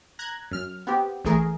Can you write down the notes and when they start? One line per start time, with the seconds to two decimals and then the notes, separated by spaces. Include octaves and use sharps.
0.19 A#5 F#6 G#6
0.51 F#2 F6
0.87 B3 C4 G4
1.25 A#1 E3 A3 G#4 A#4